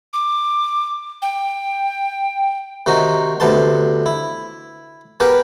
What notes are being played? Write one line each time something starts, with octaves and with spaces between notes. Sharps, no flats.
D6
G5
C3 D#3 D#4 F#4
D2 C3 B3 A5 C6
E4
B3 G4 G#4 A#4 B4